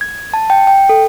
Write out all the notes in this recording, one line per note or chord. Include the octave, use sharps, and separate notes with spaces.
G#6
A5
G5
G5
A4